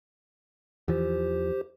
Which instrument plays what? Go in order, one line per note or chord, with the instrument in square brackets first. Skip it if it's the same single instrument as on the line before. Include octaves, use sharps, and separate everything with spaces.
[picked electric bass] E2 E3 F3 [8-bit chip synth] G4 C5